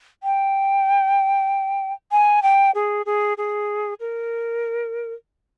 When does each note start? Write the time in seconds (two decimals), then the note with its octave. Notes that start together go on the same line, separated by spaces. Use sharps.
0.23 G5
2.11 G#5
2.43 G5
2.75 G#4
3.06 G#4
3.37 G#4
4.00 A#4